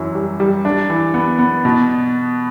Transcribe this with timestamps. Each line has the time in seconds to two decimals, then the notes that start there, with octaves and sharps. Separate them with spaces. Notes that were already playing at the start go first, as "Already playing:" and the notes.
Already playing: F#2 E3 F#3
0.15 G3
0.40 G3
0.65 D4
0.90 E3
1.14 B3
1.39 B3
1.65 B2